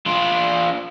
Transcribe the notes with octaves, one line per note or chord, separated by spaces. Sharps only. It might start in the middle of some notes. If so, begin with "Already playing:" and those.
D4 F4